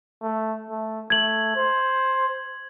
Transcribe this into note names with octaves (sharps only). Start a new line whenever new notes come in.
A3
A3
A3 G#6 F#7
C5